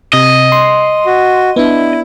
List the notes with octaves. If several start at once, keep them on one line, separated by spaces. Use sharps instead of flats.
C3 D#5
C6
F#4
B3 D4 E4